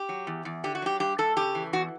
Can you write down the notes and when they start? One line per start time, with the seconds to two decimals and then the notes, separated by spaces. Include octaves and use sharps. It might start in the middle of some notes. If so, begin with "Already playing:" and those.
Already playing: G4
0.09 F#3
0.27 E2
0.45 E2
0.64 D3 G4
0.75 F#4
0.82 F#3 G4
1.00 G2 G4
1.18 G2 A4
1.36 C#3 G4
1.55 E3
1.73 E2 F#4